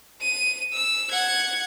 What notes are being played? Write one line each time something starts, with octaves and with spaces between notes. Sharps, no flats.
D#7
E6
F#5 G#6